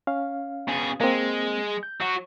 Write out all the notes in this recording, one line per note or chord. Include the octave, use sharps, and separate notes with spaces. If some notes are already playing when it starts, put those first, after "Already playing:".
C#4 F5
B2 G#4
G#3 A#3 C4
G6
F#3 F#4